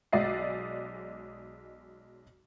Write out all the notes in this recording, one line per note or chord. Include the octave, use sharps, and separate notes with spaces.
B1 F#3 G#3 D5 D#5 C7